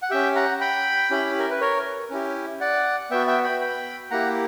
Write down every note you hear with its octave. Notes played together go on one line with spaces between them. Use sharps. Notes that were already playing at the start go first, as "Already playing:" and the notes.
F#5
C#4 G4 E5 G5
F#5 A#5
G5 B5
C#4 E4 G4
A#4
B4
A#4 C#5
C#4 E4 G4
D5 F#5
B3 F#4 E5 G5
E5 G5
G5 B5
G5 B5
A#3 E4 G4 F#5 A#5